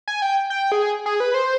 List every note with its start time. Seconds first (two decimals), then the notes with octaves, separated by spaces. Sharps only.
0.08 G#5
0.22 G5
0.50 G5
0.72 G#4
1.06 G#4
1.20 B4
1.34 C5